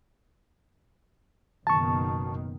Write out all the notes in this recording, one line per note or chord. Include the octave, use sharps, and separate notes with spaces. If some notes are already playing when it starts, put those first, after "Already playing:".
F#1 B2 D#3 A5 C#6